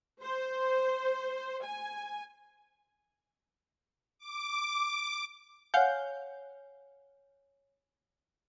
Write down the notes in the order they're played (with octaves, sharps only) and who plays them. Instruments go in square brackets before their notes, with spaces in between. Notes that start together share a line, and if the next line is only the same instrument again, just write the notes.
[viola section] C5
G#5
[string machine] D6
[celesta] C#5 G#5 [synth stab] F5 F#5 G6